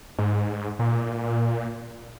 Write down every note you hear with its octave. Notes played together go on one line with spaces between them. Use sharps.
G#2
A#2